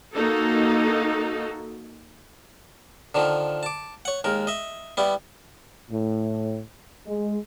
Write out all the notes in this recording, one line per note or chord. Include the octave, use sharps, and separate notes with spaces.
A#3 D#4 F#4 A4
D3 D#3 F3
A5 D6
C#5 F#5
D#2 G#3 A#4
D#5 E5
G3 B3 E4
A2
G#3